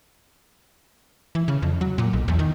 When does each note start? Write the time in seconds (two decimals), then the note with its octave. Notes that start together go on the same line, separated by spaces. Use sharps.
1.35 E3
1.48 C#3
1.62 F2
1.81 F#3
1.98 A#2
2.13 B1
2.28 E2
2.39 D#3